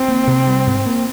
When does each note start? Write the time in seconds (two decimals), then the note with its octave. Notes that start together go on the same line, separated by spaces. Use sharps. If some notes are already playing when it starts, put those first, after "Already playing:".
Already playing: C4
0.08 A#3
0.27 C3
0.47 G3
0.67 G#2
0.86 A#3